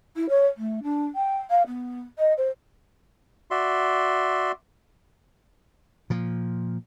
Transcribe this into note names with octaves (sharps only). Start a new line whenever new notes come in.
E4
C#5
A3
D4
G5
F5
B3
D#5
C5
F#4 D5 E5 C6
A#2 F3